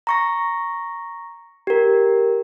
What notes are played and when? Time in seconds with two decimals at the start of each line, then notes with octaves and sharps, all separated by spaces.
0.07 A#5 C#6 A#6
1.67 G4 A#4